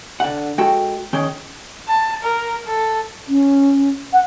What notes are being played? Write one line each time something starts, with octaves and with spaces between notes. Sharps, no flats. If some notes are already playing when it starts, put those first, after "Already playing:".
D3 F#5
G#3 F#4 A4 G5
D#3 C#4 G#4 C#5 G5
A5
A#4
A4
C#4
F#5